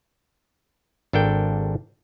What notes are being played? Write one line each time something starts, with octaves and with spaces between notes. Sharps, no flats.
G#1 D4 A4 A#4 G5